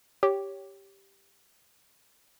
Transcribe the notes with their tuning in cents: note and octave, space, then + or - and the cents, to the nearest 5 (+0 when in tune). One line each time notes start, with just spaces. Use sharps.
G4 +0 C#5 +5